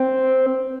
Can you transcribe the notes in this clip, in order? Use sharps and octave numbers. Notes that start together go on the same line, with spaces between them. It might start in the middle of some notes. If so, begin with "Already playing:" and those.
Already playing: C4